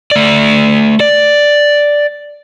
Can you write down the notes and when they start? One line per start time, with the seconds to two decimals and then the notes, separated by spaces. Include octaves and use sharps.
0.11 A3 D5
1.00 D5